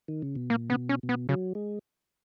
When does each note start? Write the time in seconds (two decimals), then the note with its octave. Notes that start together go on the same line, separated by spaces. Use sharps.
0.08 D#3
0.22 C#3
0.36 B2
0.50 A#2 A#3
0.69 C#3 B3
0.76 B2
0.89 C#4
1.03 B2
1.09 B3
1.29 C#3 F#3
1.55 G#3